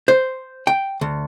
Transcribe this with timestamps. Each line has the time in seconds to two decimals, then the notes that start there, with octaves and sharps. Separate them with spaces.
0.08 C5
0.67 G5
1.01 D2